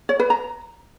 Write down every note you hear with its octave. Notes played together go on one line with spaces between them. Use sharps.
C#5
B4
A#5